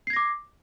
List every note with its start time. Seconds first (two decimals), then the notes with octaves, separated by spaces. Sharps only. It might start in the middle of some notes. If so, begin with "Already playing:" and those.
0.07 C7
0.10 G#6
0.13 A#6
0.16 D6